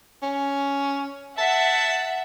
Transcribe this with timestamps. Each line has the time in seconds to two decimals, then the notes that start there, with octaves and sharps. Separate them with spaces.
0.23 C#4
1.38 E5 F#5 A5